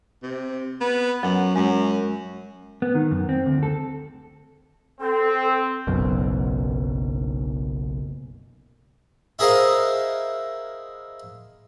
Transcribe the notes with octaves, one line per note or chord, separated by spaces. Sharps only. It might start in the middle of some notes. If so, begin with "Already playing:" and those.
C3
B3
F#2 F#3
F#2 G#3
B3
D#3
F#2
C4
D2
A4
C4 A4
F#1 B1 F#2 B2
E4 G#4 A#4 C5 D#5 F5